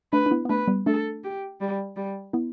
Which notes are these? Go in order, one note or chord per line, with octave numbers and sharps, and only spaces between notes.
A3 D4 B4
D4
B3 E4
B3
A3 D4 B4
G3 B3
A3 D4 A4
G4
G3
G3
B3 E4